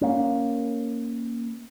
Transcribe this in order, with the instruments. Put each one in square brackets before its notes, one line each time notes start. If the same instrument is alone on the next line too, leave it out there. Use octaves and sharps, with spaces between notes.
[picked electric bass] A#3 C#4